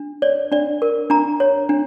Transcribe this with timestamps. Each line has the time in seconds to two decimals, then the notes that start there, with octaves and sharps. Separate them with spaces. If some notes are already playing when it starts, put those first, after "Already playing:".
Already playing: D4
0.22 C#5 D5
0.52 D4 D5
0.82 A#4
1.10 D4 A#5
1.40 C#5
1.69 D4